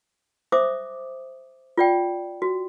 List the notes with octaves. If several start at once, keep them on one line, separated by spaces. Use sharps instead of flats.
C5 E5 D6 D#6
F4 D5 G5
F#4